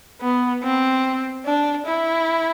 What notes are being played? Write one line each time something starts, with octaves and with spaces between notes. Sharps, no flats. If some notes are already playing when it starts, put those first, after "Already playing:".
B3
C4
D4
E4